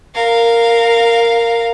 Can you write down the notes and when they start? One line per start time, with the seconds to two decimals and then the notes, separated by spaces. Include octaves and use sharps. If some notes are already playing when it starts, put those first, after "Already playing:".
0.15 A#4 F5